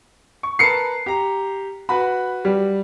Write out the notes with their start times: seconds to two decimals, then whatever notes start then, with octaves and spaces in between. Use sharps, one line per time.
0.43 C#6
0.59 A#4 B4 A5 C7 C#7
1.06 G4 A#5
1.89 F#4 B4 B5
2.45 G3